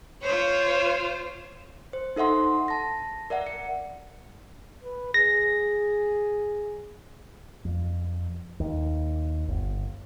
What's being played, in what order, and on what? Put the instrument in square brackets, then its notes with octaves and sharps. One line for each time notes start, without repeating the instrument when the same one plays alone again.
[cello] F4 C5 [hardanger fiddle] C#5
[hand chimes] C5
D#4 A4 E5 F#5 C6
A5 A#6
A#4 D5 E5 F#5
C#7
[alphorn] B4
[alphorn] G#4 [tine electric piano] A#6
[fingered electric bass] F2
D#2
G1